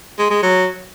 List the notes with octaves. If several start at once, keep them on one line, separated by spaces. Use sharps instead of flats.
G#3
G#3
F#3